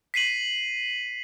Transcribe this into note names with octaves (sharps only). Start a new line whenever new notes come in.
B6 C7 D#7 F#7